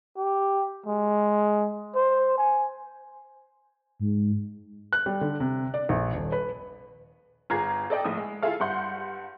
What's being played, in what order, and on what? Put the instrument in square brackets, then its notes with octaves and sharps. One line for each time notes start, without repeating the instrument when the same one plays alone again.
[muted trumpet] G4
G#3
C5
G#5
[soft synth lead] G#2
[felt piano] F#6
G3
D3
C3
D5
A#1
D#1
B4
[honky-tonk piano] G1 F4 G#4 A#5 G#6 C7
A4 D5 D#5 G5
A#1 A2 D#6
G#3
E4 F4 G#4 A4 F5
G2 F#5 C6 G6